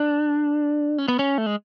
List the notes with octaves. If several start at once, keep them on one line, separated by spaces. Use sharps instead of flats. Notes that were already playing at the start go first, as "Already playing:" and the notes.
Already playing: D4
C#4
B3
C#4
A3
G#3